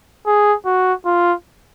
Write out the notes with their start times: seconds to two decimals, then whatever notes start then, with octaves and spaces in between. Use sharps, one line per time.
0.27 G#4
0.65 F#4
1.05 F4